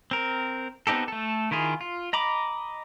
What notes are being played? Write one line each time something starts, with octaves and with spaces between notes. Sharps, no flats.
C4 A#4
B3 C4 D#4 G4 A4
A3 A4
D#3 E4 F4 G#4
F4
D#5 A#5 B5 D6